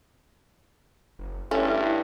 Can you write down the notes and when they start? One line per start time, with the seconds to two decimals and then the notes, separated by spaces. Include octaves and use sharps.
1.19 F#1
1.51 G2 A3 C#4 E4